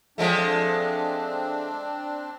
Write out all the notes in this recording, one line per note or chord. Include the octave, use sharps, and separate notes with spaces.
F3 G#3 A3 C4 D4